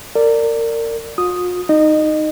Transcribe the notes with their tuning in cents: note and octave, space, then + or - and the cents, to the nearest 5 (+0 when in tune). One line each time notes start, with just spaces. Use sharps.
A#4 -30 D5 +0
F4 +45 D#6 +0
D#4 +0 D#5 -25